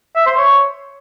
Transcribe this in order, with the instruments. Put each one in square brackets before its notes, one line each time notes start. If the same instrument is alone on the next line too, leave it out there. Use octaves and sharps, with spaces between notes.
[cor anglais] E5
C5
C#5